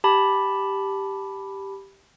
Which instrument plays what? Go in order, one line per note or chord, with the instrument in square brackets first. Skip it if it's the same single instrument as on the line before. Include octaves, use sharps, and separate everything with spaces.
[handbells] G4 A5 B5